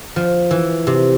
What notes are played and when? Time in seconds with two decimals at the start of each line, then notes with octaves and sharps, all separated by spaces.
0.16 F3
0.51 E3
0.87 C3